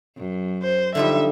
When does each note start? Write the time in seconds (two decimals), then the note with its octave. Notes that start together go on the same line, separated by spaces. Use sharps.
0.17 F#2
0.63 C5
0.95 D3 F3 G3 D#4 E5